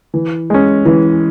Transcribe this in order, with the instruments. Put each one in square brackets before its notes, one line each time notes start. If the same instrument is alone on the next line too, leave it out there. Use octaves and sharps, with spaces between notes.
[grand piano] E3
G#3 C#4
E3